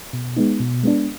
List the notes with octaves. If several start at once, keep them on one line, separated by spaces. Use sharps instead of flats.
B2
G#3 B3 D#4
B2
G#3 B3 D4